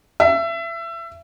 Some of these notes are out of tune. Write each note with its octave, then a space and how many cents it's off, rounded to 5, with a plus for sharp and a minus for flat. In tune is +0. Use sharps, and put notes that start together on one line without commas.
E5 +25